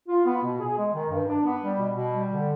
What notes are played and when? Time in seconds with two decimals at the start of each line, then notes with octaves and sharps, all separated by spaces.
0.08 F4
0.26 B3
0.42 B2
0.60 G#4
0.77 G#3
0.94 D#3
1.10 G2
1.28 D4
1.44 B3
1.62 G3
1.79 B2
1.95 B2
2.13 G3
2.30 D3